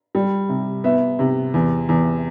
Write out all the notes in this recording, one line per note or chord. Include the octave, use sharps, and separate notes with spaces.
G3
C3
B3 E5
C3
E2
E2